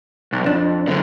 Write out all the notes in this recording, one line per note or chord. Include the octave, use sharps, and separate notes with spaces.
B1
F2 D4
F#2 D3